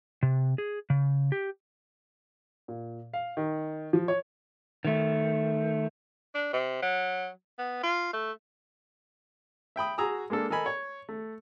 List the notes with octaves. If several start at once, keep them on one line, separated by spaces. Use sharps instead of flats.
C3
G#4
C#3
G4
A#2
F5
D#3
F3
C#5
D#3 A3
D4
C3
F#3
B3
F4
A3
E5 G5 B5 D#6
F#4 G#4 A#5 D#6 E6
G#3 A#3 D4 A4
A4 A#4 D#5 G#5 B5
C#5
A3